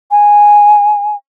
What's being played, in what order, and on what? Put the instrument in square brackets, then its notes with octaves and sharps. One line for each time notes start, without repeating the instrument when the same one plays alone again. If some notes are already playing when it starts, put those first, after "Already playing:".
[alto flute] G#5